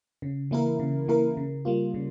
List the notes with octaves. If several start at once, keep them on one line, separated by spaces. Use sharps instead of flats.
C#3
E3 A#3 E4 A#4
C#3
E3 A#3 E4 A#4
C#3
G3 A#3 F4
C#3